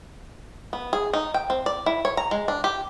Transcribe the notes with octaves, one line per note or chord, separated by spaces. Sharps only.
B3
G#4
D#4
G5
C4
D5
E4
C#5
A#5
G#3
D4
G4